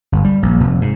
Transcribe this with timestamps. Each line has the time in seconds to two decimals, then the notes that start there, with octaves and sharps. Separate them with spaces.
0.12 G1
0.24 G3
0.43 A#1
0.60 F1
0.81 G#2